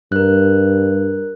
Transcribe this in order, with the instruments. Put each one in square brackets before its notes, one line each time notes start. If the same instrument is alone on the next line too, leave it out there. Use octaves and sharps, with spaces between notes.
[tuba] G2 [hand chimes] A#4 F#6